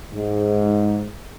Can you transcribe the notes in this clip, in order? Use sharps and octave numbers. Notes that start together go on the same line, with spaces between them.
G#2